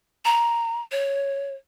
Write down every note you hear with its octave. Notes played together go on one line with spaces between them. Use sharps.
A#5
C#5